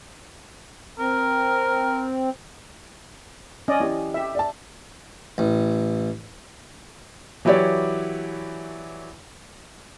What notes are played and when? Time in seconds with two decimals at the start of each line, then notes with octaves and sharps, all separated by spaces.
0.99 C4 A#4
3.68 C#4 D5 D#5
3.80 E3 G4
4.14 G4 E5
4.35 D5 A5
5.38 A1
7.45 E3 F#3 E4 G4 C#5 D5